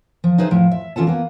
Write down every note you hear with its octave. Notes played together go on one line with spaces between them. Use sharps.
F3
D#4 G#4 B4 C5 E5
A2 F3
E5
E3 C#4 F4 A4 A5
A#3 B3